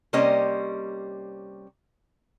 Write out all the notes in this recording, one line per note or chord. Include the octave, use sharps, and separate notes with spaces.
C3 G3 A#3 C#4 C5 D#5